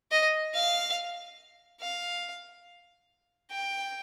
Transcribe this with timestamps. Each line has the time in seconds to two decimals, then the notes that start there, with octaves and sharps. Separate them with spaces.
0.12 D#5
0.55 F5
1.81 F5
3.51 G5